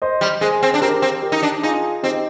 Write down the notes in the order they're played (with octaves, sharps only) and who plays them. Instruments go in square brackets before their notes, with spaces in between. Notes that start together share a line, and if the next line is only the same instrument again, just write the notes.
[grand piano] C5 D#5
[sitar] G3
[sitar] G#3 [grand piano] G#4 C5
[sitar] C4
D4
[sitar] C4 [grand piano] G4 A#4
[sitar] C4
[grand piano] G4 A#4
[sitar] D#4
D4
[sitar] D#4 [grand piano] F4 G#4
[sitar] C4 [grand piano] D#4 G4